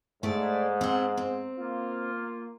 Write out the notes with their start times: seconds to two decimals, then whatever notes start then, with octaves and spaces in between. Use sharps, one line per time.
0.23 G#2 A3 D5
0.81 C4 F#5
1.17 C4
1.59 A#3 F4